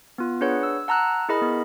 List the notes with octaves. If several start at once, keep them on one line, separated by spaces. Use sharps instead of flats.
B3 F4
D4 G#4 B4 C#5 F#5
E6
F#5 A5 A#5 E6 F#6
E4 G#4 A#4 D#5 B5
B3